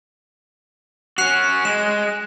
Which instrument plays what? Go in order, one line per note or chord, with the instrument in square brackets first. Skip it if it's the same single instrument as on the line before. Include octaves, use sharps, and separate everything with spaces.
[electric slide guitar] C#4 F#4 [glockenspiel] F#6 C7 F7
[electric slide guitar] G#3 [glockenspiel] E7